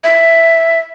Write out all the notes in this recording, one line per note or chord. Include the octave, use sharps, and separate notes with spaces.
E5